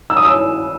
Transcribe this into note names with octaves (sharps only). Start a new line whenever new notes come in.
E6
D#6
E6